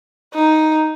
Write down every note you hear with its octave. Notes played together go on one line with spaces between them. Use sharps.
D#4